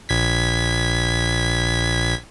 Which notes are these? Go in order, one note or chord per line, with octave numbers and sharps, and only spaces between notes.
A#1 G#6 B6